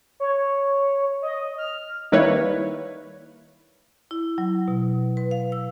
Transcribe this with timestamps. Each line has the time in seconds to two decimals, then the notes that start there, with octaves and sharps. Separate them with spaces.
0.20 C#5
1.22 D#5
1.58 F6
2.12 D#3 G3 A#3 E4 B4 C#5
4.11 E4
4.38 F#3
4.68 B2
5.17 B4
5.31 F5
5.52 E6